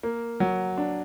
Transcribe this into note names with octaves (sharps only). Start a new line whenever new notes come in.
A#3
F#3
D4